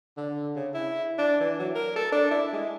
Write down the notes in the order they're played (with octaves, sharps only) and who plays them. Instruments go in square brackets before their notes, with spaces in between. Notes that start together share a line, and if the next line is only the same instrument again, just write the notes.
[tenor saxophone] D3
C#3
E4
D4
E3
F#3
A#4
A4
D4
E4
G#3